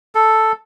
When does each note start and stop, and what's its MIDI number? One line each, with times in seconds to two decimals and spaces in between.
0.15 0.52 69